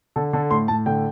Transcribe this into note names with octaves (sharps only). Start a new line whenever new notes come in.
D3 A4
D3 A4
A2 C6
A2 A5
D3 G5